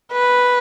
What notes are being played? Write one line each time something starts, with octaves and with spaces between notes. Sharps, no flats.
B4